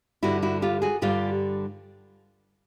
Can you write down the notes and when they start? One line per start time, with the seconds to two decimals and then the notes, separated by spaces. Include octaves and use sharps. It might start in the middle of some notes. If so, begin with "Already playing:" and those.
0.23 G2 D3 G3 E4 F#4
0.42 E4 F#4
0.62 F4 G4
0.82 F#4 G#4
1.02 G2 D3 G3 F4 G4